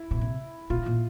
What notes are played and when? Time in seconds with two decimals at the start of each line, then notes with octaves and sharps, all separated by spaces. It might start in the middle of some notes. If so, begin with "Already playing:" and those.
Already playing: E4
0.11 B2
0.21 C3
0.70 B2 F4
0.86 A#2